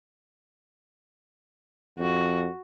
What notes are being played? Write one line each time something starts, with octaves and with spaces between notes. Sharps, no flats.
F2 F#4